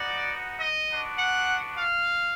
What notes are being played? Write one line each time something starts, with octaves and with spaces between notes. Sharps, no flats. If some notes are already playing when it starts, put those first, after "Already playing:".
Already playing: B3 D#4 F#4 D5
D#5
B3 D4 F#4
F#5
F5